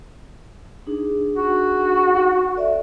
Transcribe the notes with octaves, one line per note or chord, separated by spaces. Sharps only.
D4 D#4 G#4
F#4
A4 D5 E5